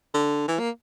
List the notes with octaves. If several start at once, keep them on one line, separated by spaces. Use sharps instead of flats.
D3
E3
A#3